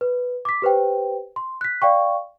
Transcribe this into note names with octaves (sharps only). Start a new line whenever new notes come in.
B4
D6 B6
G4 B4 C5 G5
C6
F#6 B6
D5 F5 G5 C#6